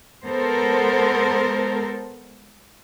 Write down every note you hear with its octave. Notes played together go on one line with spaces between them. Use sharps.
G#3 B3 A4 A#4 C5